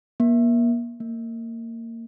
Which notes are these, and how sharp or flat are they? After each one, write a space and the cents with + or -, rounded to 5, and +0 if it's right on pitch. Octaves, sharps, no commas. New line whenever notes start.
A#3 +30
A#3 -25